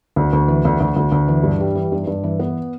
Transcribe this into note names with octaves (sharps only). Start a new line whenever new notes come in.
D2
D2
E3
D2
D2
D2
D2
E3
G2
G3
E3
G2
G2
E3
B3